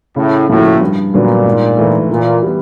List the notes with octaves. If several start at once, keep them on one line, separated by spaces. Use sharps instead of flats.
A2 C#3
A2 F3 A#3 C#4 F#4
G2
A#2 D3 F#3 B3 D4
G#2
E3 A3
A#2 E3
G3 B3